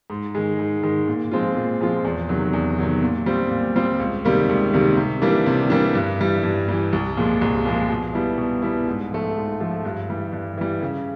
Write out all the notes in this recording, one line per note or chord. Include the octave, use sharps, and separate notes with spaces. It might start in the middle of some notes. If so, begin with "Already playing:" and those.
G#2
D#3 G#3
G#2
D#3 G#3
A#2
F3 G#3 C4 F4
A#2
F3 G#3 C4 F4
E2
C3 D#3 F#3
E2
C3 D#3 F#3
A#2
G3 C4 F4
A#2
G3 C4 F4
C#2
C3 D#3 G3 A#3
C#2
C3 D#3 G3 A#3
C3
E3 G3 A#3 D4
C3
E3 G3 A#3 D4
G2
E3 G3
G2
E3 G3
C2
A#2 F3 G#3
C2
A#2 F3 G#3
B2
G3 B3 E4
B2
G3 B3 E4
G#2
F3 A3
G#2
F3 A3
G2
E3 G3
G2
E3 G3
C#3